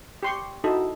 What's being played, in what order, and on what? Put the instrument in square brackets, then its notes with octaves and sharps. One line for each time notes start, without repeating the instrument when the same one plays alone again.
[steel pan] G4 C6 C#6
[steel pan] D#4 E4 A4 [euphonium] F#4